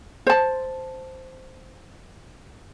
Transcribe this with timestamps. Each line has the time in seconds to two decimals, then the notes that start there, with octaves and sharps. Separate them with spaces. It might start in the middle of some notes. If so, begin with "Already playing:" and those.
0.27 C5 A5